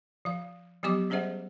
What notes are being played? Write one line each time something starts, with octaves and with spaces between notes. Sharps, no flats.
F3 F5
F3 F#3 B3 G4 D#5 D6
G3 C#4 G#4 C5 E5 F#5